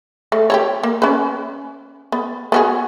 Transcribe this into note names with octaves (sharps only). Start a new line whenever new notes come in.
A3
G4 A4 C#5
A#3
C#4 B4
B3
B3 F#4 G#4